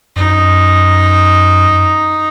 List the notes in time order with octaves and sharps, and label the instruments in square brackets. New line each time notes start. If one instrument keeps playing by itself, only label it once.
[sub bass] F#2 [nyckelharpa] D#4